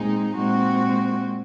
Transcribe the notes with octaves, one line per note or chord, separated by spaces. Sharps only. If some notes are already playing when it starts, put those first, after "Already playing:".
Already playing: A#2 G#3 C4 D#4 G#4
A#2 G#3 C4 F#4